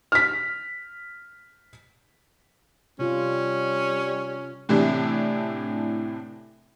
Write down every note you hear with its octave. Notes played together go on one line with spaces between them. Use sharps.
F6 B6
C3 G3 C#4 F4
A2 C3 E3 D4 E4